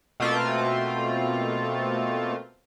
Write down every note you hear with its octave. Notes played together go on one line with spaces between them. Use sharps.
B2 A3 A#3 C4 F4